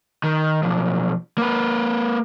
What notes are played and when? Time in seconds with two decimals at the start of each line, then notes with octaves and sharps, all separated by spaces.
0.24 D#3
0.63 B1 F3
1.38 A#3 B4